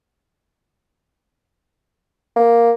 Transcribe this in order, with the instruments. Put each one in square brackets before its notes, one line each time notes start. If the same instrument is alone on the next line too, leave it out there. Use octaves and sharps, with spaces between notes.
[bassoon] A#3